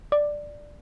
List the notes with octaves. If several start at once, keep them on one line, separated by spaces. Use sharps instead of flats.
D5